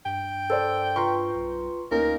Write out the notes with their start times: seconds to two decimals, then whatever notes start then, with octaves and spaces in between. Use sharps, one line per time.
0.05 G2 G5
0.50 A4 C5 D5 E6
0.96 F4 B4 A#5 C6 C#6
1.35 B1
1.91 D2 A#3 C#4 D#4 A#4